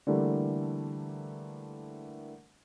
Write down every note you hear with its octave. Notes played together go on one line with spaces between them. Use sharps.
D3 E3 G3 A3 A#3